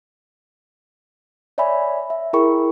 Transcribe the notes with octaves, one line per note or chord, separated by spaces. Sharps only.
C#5 D5 E5 G#5 B5
E5
E4 G#4 A#4 G5 B5 C#6